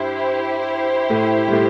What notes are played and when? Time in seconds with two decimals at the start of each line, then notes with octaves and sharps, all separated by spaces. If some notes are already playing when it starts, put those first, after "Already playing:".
Already playing: G2 E4 G4 C5
1.10 A2 A3
1.48 G3
1.52 A2 A3